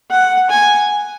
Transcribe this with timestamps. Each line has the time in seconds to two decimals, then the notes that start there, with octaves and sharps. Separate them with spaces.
0.11 F#5
0.50 G#5